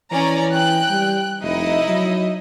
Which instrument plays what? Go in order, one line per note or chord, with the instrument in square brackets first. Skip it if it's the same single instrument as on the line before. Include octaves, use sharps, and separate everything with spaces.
[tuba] E3 [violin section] C#4 D5 A#5
[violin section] G5 F#6
[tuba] G3
[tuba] F1 [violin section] D#4 E4 D#5
[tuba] F#3